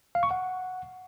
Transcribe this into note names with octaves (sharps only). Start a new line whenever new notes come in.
F5
C#6
F#5